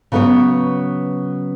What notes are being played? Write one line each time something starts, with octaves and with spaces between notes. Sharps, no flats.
C#3 F#3 B3 B4 C#5